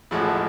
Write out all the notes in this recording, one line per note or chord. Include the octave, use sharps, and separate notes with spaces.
A1 A2 F3 G#3 E4 F#4